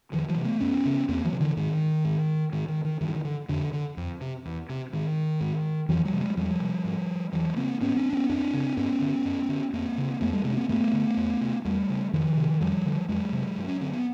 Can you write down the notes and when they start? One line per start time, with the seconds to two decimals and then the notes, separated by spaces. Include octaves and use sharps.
0.12 F2 D#3 F3
0.29 E3 F#3
0.36 C3
0.44 A3 B3
0.60 F#2 B3 C#4
0.85 C#3
1.08 E2 A#3 C4
1.24 E3 F#3
1.33 C3
1.40 D3 E3
1.57 G#2 D#3
2.05 G#2
2.53 G#2 D#3
2.68 D#3
2.85 D#3
3.01 G2 D#3
3.08 E3
3.15 D#3
3.24 D3
3.49 F2 D3
3.73 D3
3.97 F2
4.21 C3
4.45 E2
4.69 C3
4.93 G#2 D#3
5.41 G#2
5.89 F2 E3 F#3
6.05 F3 G3
6.13 C3
6.20 F#3 G#3
6.37 E2 F3 G3
6.61 C3
6.85 G#2
7.32 E2 E3 F#3
7.56 C#3 A#3 C4
7.81 G#2 B3 C#4
7.96 C4 D4
8.13 B3 C#4
8.29 F#2 C4 D4
8.54 C#3
8.77 G2 B3 C#4
9.01 D3
9.25 F#2
9.49 D3
9.73 F2 A#3 C4
9.98 C#3
10.21 F2 A3 B3
10.33 G3 A3
10.44 C3 G#3 A#3
10.52 C#4
10.57 A#3 C4
10.69 G2 A3 B3
10.93 D3
11.17 E2
11.41 C3
11.65 E2 G3 A3
11.89 C#3
12.13 F2 D#3 F3
12.37 C3
12.60 F2 F3 G3
12.86 D3
13.09 F2 F#3 G#3
13.32 C3
13.57 G2
13.68 C#4
13.81 D3 C4
13.92 B3